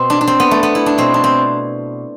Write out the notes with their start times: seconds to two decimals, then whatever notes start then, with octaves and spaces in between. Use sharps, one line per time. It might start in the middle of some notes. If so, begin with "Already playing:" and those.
Already playing: B2 C4
0.10 D4
0.21 D4
0.27 C4
0.40 B3
0.51 A3
0.63 B3
0.75 E4
0.86 D4
0.98 B2 C4
1.14 D4
1.24 C4